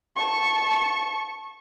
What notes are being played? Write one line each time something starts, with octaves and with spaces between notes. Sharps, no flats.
A5 C#6